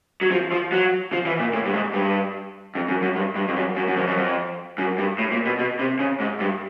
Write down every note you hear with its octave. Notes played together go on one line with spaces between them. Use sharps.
F#3
F3
F3
F#3
F3
E3
A#2
A2
G2
G#2
G2
F2
F#2
F#2
G2
G2
F2
F#2
F#2
F#2
F2
F#2
F2
F#2
G2
A2
A#2
B2
B2
C3
C#3
G#2
G2